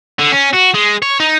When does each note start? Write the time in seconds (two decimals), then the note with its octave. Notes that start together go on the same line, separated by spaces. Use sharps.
0.19 D3
0.32 C#4
0.54 F#4
0.75 G#3
1.02 C#5
1.20 D#4